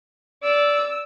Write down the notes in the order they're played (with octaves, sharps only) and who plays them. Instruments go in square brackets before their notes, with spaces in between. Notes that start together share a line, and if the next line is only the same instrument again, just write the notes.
[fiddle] D5 [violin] E6